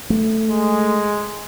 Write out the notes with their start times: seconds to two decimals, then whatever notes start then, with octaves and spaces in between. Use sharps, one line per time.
0.10 A3
0.49 G#3